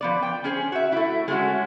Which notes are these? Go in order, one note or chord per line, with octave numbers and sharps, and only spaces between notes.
F3 B3 D5
G5
C#4 G#4 C5
F#4 E5
A3 E4
G#3 A3 C#4 F#4